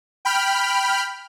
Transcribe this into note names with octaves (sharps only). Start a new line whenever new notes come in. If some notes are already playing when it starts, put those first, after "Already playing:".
G5 B5 F6